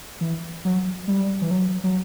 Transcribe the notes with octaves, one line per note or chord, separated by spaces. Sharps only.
E3
F#3
G3
E3
F#3
F#3